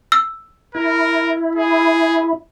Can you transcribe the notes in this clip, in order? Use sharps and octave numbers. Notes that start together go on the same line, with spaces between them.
E6
E4 A#4
G#4